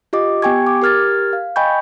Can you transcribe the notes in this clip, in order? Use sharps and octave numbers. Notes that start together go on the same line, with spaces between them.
F4 G4 D#5 D6
B3 G4 G5 G#5 C#6 G#6
D6
G4 A#4 F6 G#6 A6
F5
D#5 G5 G#5 B5 C#6 G6